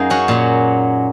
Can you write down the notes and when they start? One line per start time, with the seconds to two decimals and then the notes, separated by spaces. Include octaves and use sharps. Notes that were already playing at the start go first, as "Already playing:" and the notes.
Already playing: F#2 F#3 A#3 D#4 G#4
0.10 C#4 F#4
0.28 A#2 F#3